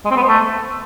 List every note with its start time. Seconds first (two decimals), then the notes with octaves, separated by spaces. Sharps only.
0.05 G#3
0.11 C4
0.17 B3
0.22 C5
0.28 A3